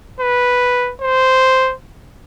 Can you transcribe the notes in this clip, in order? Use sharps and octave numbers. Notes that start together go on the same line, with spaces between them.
B4
C5